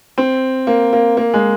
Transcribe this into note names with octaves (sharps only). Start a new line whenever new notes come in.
C4
A#3
A#3
A#3
G#3